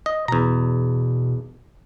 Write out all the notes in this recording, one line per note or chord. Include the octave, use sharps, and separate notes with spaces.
D#5
E2 B2 A#5